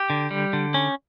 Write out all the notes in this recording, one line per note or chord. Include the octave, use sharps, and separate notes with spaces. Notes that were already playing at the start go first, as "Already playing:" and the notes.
Already playing: G4
D3
G3
D3
C#4